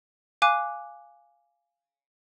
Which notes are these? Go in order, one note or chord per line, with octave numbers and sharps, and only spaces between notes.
F5 G#5 D6 F#6 D#7